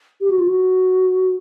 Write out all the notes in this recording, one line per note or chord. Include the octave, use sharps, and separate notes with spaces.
G4
F#4
F4
F#4